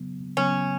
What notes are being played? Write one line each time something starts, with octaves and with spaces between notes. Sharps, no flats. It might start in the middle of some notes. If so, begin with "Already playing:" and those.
Already playing: C#3 F#3 B3
C#3 F#3 B3 C#4